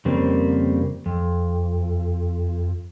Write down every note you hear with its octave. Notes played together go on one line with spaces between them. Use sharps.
F2 C#3 G3 A#3 C4
F2